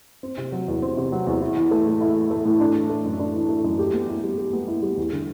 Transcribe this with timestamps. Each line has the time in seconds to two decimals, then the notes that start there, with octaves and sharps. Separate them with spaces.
0.23 C4
0.38 C3
0.52 F#3
0.68 E2
0.82 C4
0.97 C3
1.12 F#3
1.27 E2
1.41 E4
1.56 E3
1.71 A3
1.86 A2
2.01 E4
2.16 E3
2.31 A3
2.45 A2
2.60 D4
2.75 E3
2.90 A3
3.05 F#2
3.19 D4
3.34 E3
3.49 A3
3.64 F#2
3.79 G4
3.93 B3
4.08 E4
4.23 G3
4.38 G4
4.53 B3
4.68 E4
4.82 G3
4.97 E2
5.12 D3